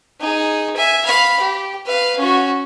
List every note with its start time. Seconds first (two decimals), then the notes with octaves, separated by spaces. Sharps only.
0.21 D#4 G#4
0.76 E5 G#5
1.05 F5 B5
1.41 G4
1.86 B4 F5
2.18 C#4 F#4